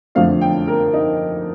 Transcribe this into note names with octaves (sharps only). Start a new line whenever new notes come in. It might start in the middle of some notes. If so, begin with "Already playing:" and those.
F2 D3 F3 A3 C4 F5
G5
A#4
D#4